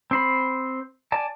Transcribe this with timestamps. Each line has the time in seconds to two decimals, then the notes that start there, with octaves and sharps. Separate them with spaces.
0.11 C4 C5 B5
1.12 D5 G#5 A5